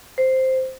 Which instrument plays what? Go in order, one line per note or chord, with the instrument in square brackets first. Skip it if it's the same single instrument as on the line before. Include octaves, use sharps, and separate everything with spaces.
[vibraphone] C5